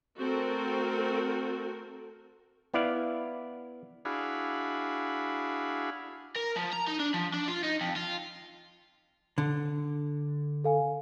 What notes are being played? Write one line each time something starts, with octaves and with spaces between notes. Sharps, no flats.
A3 C4 F#4 A4 A#4
B3 E4 D5 F5
D4 E4 F#4 G#4 F5 B5
A#4
F3
A#5
D#4
D4
F3
D4
F4
D#4
F2
F4
D3
A4 F5 G#5